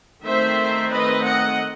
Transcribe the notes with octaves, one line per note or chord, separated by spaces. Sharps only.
D#3 A3 C4 C5 E5
B4 D#5
D#5 F#5